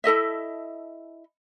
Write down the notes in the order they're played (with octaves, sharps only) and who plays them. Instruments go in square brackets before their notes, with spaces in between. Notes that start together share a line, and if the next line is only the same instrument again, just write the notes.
[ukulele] E4 A4 D#5 E5